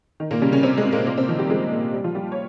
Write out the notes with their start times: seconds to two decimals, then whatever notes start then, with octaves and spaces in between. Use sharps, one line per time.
0.20 D#3
0.31 A#2 A#3
0.41 C#3 G3 C#4
0.52 C#3 C#4
0.63 C3 C4
0.77 G#3
0.85 C3
0.92 A#2 A#3
1.07 A#2 A#3
1.17 C3 C4
1.28 D#3 F3 D#4
1.39 G3 G4
1.50 F3 G#3 G#4
1.72 A#2
1.93 G3
2.04 F3 F4
2.15 G3 G4
2.32 C#5